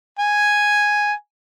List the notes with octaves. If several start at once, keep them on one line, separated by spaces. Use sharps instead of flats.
G#5